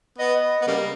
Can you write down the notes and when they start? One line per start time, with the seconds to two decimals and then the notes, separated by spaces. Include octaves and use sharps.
0.19 B3 D#5
0.62 B3
0.67 C#3 G3 A#3